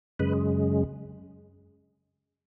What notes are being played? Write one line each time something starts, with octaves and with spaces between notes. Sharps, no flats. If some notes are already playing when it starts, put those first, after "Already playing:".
F#2 C#3 G#3 B4